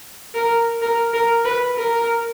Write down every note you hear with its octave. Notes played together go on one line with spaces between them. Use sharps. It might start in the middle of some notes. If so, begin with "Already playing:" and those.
A#4
A#4
A#4
B4
A#4